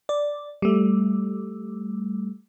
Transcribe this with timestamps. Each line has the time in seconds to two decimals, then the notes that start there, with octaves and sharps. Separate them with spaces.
0.09 D5
0.62 G3 A3